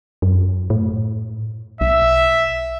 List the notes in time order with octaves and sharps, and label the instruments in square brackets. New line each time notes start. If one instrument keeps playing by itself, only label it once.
[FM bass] F#2
A2
[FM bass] B1 [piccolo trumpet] E5